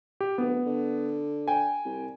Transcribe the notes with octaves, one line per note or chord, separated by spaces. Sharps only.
G4
D1 B3
D3
G5 G#5
C2